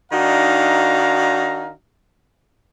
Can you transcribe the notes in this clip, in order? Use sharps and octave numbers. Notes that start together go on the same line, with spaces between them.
D#3 D4 D#4 F#4 F5 A#5